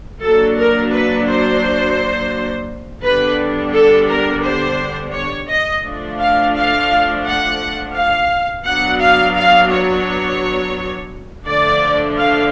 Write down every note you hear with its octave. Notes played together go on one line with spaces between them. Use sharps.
F#3 A#3 D4 A4
A#4
B4
C5
D3 G3 B3 D4 B4
A4
A#4
C5
C#5
D#5
F3 A3 D4
F5
F5
F#5
F5
F#3 B3 D4 F#5
F5
F5
C#5
D3 F3 A3 D4 D5
F5